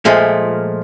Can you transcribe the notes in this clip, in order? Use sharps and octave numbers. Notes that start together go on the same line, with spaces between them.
A#2 F3 G#3 A3